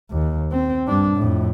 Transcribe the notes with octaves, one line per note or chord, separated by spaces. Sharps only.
D#2
C4
G2 D4
F2 A2